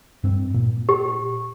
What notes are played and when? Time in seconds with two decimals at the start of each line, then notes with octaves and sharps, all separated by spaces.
0.24 G2 C4
0.54 A#2
0.89 G4